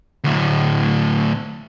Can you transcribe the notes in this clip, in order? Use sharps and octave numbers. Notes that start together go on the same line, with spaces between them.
D2 A2